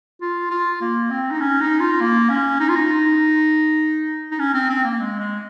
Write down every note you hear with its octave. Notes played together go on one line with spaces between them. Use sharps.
F4
F4
A#3
C4
D#4
C#4
D#4
F4
A#3
C#4
D#4
F4
D#4
D#4
C#4
C4
C4
A#3
G#3
G#3